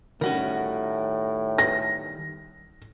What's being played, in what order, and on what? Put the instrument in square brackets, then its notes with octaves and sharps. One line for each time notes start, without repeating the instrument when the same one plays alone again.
[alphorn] A2 [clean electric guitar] D#3 G3 [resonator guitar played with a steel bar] C#4 F#4 A#4
[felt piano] A#6